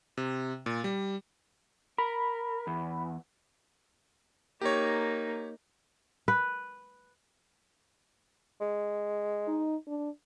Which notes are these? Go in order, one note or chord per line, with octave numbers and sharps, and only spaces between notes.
C3
A#2
G3
A#4 B5
E2
A#3 D#4 G4 C#5
B4
G#3
D#4
D4